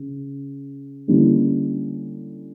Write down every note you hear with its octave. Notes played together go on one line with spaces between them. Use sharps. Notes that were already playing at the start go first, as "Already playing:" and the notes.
Already playing: C#3
D3 G3 A#3 C#4 E4